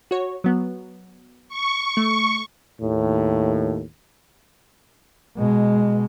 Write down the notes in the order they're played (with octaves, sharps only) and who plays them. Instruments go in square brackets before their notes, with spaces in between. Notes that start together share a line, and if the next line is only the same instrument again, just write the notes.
[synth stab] F#4 C#5
F#3 B3
[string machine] C#6
[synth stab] A3
[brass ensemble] D#2 A2
[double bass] B2 G#3